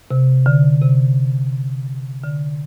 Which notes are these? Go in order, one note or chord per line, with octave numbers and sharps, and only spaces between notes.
C3
D3
C3
D3